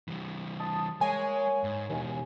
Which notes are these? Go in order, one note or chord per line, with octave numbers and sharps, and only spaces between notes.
E3 G3
A5 D#6
G#3 A#3 C#5 G#5
G#2
D#2 B2 E3